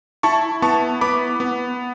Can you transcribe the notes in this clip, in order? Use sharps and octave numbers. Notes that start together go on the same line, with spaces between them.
E4 A5 C#6
B3 A5 C#6
B3 B5 D6
B3